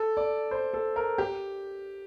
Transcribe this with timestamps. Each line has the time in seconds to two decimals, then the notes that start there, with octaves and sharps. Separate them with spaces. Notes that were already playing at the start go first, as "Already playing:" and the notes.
Already playing: A4
0.17 D5
0.51 C5
0.74 A4
0.96 A#4
1.18 G4